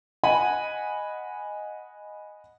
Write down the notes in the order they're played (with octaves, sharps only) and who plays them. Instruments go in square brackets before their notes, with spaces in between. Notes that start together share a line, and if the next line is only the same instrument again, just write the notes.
[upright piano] D#5 F#5 G#5 B5